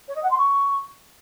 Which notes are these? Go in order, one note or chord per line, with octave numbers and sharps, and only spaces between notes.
C#5
D#5
F#5
C6
C#6